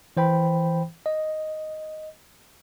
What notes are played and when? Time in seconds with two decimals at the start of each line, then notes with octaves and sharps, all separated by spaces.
0.17 E3 C5 G5 B5
1.06 D#5